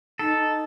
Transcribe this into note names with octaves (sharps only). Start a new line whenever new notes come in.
D#4 A4